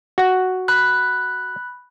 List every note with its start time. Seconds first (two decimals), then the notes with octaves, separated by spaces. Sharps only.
0.18 F#4 F#5
0.68 B5 F#6